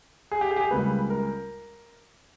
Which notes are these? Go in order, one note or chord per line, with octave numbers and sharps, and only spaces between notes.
G#4
G4
G#4
G4
G#4
C#2 C#3 G3 A#3 B4
A#4